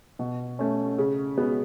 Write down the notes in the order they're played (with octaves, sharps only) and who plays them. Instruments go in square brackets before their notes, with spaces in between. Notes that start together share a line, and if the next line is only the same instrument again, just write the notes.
[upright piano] B2
A3 C#4
C#3
G#3 B3 F#4 B4